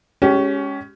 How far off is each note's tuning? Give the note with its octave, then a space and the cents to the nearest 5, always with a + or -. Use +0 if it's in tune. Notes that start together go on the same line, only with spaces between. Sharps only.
G#3 +0 C#4 +10 G4 -30